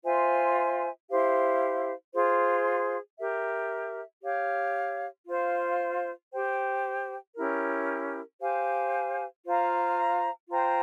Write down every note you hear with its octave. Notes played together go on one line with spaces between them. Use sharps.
F4 C5 E5 G#5
E4 G4 C5 F5
F4 G#4 C5
G4 A#4 E5
G4 C#5 F5
F4 C5 F5
G4 C5 G5
C#4 E4 G4 A#4
G4 C5 F5 G#5
F4 C5 F5 A#5
F4 C5 G5 A#5